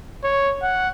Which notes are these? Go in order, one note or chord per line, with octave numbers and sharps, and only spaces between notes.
C#5
F#5